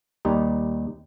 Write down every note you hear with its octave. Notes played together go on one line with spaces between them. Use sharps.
D#2 G3 D#4